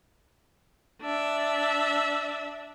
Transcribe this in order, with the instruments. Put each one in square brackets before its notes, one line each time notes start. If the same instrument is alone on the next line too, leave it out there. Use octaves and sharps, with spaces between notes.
[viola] D4 E5